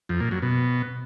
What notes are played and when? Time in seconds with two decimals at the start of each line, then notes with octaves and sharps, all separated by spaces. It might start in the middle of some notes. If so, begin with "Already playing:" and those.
0.09 F2
0.20 A#2
0.31 F#2
0.42 B2